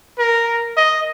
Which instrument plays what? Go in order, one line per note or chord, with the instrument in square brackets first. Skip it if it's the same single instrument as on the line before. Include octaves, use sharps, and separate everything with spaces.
[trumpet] A#4
D#5